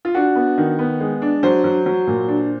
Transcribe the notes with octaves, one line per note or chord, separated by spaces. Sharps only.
F4
D4 F#4
B3
D#3
B3
G#3
D4
F#3 C5
F#3
F#3
A#2
D4